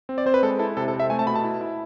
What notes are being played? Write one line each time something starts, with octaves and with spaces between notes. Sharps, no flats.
C4
D5
C4 C5
B4
G#3 A4
E4 A4
C3 A4
A4
C4
E5
A3 G#5
A5
B2 B5
A5
E4
E4